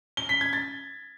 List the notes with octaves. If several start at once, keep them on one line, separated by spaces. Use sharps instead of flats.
G7
B6
G#6
A6